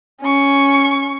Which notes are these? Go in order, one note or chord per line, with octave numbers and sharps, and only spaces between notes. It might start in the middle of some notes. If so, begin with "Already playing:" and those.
C#4 C#6